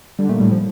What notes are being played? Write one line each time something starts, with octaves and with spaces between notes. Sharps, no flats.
D3 G3
A#2 A3
A2 G3
F3